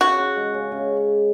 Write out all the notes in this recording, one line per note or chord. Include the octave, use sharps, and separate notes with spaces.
C#3 F#4
C#4
G#3
C#3
C#3